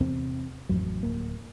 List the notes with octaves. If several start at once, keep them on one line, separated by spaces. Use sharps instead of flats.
E2 C3 C4
A1 F2 F#3
D1 A#3